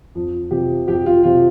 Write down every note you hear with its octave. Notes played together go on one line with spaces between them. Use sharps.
F2
C3 F3 G4
F2 G4
F4
C3 F3 F4